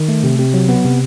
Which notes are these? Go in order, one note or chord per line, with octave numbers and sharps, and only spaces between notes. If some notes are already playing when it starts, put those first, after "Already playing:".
Already playing: D#3
A3
C3
C3
F#3
B3
C3